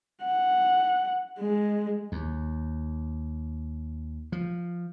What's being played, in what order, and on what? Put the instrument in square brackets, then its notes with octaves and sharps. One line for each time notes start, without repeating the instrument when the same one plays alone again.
[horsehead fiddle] F#5
G#3
[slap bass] D#2
F3